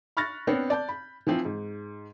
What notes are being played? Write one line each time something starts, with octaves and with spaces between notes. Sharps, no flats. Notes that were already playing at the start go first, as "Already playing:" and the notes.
B5 C#6 F6 F#6 A6 A#6
B3 C4 D4 C#5
D5 A5 G6
B5
E3 F3 C4
G#2